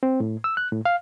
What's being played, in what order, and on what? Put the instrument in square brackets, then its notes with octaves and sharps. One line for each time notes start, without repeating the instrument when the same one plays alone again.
[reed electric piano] C4
A2
E6
F#6
A2
F5